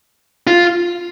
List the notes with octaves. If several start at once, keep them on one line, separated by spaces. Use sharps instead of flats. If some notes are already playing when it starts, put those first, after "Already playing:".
F4